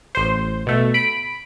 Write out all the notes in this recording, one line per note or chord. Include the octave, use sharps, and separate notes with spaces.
A1 C5
B2 A3
B5 D7